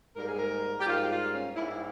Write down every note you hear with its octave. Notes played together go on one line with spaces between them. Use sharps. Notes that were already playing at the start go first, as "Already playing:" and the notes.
G#2 G3 A#3 A#4
G#4
A#4
G4
G#2 G3 A#3 F4
G4
F4
C#4
G#2 G3 A#3 E4
E4